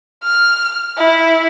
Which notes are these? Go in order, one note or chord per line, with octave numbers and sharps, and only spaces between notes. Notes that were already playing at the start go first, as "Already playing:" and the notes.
F6
E4